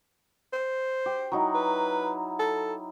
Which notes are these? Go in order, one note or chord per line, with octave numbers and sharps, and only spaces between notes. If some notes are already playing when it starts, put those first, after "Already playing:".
C5
G4
F#3 D#4 E4
B4
A4